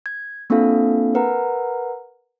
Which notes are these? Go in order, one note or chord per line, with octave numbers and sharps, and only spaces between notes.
G#6
A#3 C4 D4 F4 A4 F5
A#4 B4 F#5 A#5